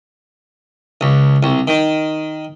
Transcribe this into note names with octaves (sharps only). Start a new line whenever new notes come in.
C#2
C2
D#3